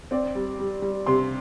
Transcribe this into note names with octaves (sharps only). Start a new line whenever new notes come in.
C4 D5
G3
G3
G3
C3 C6